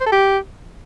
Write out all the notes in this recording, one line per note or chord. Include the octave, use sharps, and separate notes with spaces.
C5
A4
G4